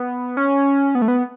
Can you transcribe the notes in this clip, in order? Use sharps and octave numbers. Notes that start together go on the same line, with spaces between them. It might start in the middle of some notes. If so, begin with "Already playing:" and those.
Already playing: B3
C#4
B3
A3
B3